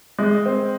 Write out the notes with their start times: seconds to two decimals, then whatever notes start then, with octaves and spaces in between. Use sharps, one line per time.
0.19 G#3
0.46 C4